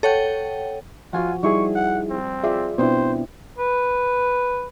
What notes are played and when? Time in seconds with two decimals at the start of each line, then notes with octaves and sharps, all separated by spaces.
0.03 A4 C#5 F#5 G5
1.13 F3 F4 F#4 F#5 G#5
1.43 G3 D#4 E4 G#4 C#6
1.75 F#5
2.10 C4
2.44 F4 G#4 D5 E5
2.78 B2 B3 C4 D4 E4 C5
3.58 B4